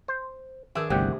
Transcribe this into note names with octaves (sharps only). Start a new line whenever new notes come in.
C5
D#3 D4 G#4 A#4 E5
G1 C2 C3 A3 G4 D5 F#5 G5